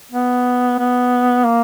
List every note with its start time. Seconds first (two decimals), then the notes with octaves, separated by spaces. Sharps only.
0.12 B3
0.79 B3
1.44 A#3